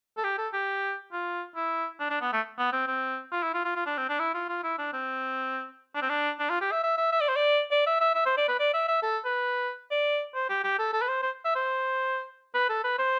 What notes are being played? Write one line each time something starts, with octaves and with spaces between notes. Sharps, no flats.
A4
G4
A4
G4
F4
E4
D4
D4
B3
A3
B3
C4
C4
F4
E4
F4
F4
F4
D4
C4
D4
E4
F4
F4
E4
D4
C4
D4
C4
D4
D4
F4
G4
E5
E5
E5
E5
D5
C5
D5
D5
E5
E5
E5
C5
D5
B4
D5
E5
E5
A4
B4
D5
C5
G4
G4
A4
A4
B4
C5
C5
E5
C5
B4
A4
B4
C5